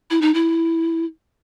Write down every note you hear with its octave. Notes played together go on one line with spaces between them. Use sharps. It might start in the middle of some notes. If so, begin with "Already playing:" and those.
E4
D#4
E4